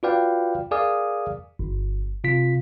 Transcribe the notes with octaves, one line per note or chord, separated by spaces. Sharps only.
F4 F#4 B4 D5 F5 G5
G#4 A#4 D5 F5 G#5 D#6
G1
C3 F4 B6